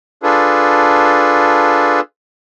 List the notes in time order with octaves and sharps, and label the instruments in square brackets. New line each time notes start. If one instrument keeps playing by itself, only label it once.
[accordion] D4 F4 G#4 A4 B4